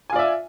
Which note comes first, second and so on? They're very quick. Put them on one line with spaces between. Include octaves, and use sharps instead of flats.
G#5 F4 D5 E5